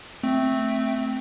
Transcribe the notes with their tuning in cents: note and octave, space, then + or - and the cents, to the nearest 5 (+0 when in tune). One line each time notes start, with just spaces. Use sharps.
A3 +0 C4 +0